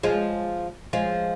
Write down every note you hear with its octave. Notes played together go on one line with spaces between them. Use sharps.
F3 G#3
F3 G#3